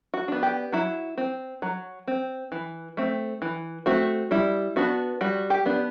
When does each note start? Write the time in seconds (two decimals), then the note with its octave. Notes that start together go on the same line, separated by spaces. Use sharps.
0.14 F#4
0.28 B3 D4
0.43 G4
0.72 F#3 E4
1.17 C4
1.62 F#3
2.07 C4
2.52 E3
2.97 A3 C4
3.42 E3
3.86 A3 C4 F#4
4.31 G3 E4
4.76 B3 D4 F#4
5.21 G3 F#4
5.50 G4
5.66 B3 D4